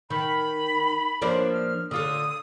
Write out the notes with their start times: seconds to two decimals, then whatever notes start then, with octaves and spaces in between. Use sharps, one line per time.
0.10 D#3 B5
1.22 F3 A#3 D4
1.52 F6
1.91 D3 F4 A4 D#6